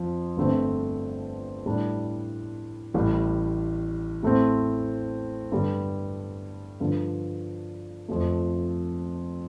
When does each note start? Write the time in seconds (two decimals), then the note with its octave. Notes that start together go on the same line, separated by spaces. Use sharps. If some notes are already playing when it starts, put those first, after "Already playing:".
Already playing: F2 F3
0.37 G1 G2 D3 A3 C4
1.66 A2 G3 D4
2.94 A1 A2 G3
4.23 A2 A3 C4
5.52 G2 D3 G3
6.80 G2 D3 F3
8.08 F2 F3 A3